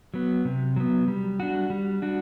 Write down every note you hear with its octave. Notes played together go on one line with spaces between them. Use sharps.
F#3 B3
C3
F#3 B3
G3
D4 F#4
G3
D4 F#4